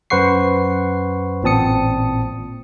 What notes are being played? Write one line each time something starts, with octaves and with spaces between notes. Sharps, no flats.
F#2 B4 C5 F#5 C#6 C7
A1 A#2 C4 A5 D#6 C#7